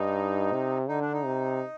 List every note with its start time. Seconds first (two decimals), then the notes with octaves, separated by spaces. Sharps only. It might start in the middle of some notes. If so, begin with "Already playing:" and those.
Already playing: G2 D#4
0.53 C3
0.89 D3 D#4
1.02 D4
1.13 D#4
1.25 C3